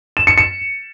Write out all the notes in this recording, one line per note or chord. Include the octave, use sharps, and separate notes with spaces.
E7
C#7
C#7